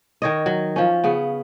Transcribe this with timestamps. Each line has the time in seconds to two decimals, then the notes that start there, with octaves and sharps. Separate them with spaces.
0.22 D#3 C#5 D#5
0.46 F#3
0.76 F3 C#4
1.04 C#3 B3